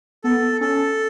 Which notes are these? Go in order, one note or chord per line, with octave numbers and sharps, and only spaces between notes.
B3 A4
C#4 A4